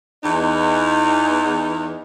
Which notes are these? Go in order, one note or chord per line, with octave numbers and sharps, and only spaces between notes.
E2 D#4